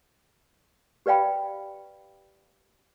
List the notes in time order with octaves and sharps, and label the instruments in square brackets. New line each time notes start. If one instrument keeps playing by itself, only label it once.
[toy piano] G4 B4 D5 F5 G5 B5